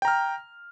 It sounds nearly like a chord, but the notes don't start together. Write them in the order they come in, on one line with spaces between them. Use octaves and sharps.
G5 A#5 F6